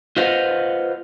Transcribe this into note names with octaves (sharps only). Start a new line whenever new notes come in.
F4 B4 C5 D#5 F5 F#5